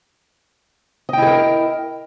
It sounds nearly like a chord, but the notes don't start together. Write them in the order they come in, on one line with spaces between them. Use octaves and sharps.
D#5 G5 E4 G#4 A#4